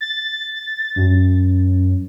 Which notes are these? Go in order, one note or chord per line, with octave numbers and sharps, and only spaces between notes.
A6
F#2